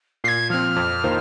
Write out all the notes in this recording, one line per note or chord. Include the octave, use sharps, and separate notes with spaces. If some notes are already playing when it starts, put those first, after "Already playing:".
A#2 G#6 C7
F3 C4 F6
F2
D#3 A#3 F4 C5